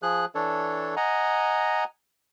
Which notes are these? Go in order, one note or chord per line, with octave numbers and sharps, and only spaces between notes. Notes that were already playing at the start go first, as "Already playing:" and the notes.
F3 G#4 F#6
E3 D4 A4 C#5
D#5 F#5 G#5 A#5